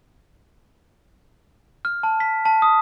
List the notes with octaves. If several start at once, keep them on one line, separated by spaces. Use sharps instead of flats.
F6
A5
B6
A5
D#6